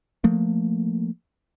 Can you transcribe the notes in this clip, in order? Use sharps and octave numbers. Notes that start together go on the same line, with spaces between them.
F3 A3 A#3